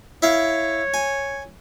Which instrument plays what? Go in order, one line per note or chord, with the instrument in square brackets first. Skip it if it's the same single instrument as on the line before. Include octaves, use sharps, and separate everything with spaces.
[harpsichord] E4 F5 [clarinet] C#5
[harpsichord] G#5